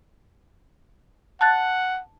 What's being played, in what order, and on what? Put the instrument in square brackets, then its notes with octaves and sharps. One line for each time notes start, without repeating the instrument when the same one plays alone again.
[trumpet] F#5 [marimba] A5 F#6 A6